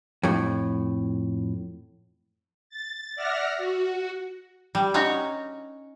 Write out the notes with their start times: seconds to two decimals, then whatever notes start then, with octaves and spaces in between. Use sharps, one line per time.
0.23 F2 A2
2.70 A6
3.15 D5 E5 F#5 F6 A#6
3.58 F#4
4.75 G3
4.94 C#4 D#4 F#4 C#5